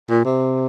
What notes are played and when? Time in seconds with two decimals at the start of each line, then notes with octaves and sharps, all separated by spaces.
0.10 A#2
0.24 C3